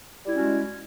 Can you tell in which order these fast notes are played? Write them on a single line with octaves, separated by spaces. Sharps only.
G3 E4 C#4 F#4 G#3